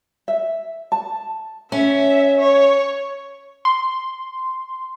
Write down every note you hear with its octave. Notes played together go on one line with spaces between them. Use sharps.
E5
A5
C#4 E5
C#5
C6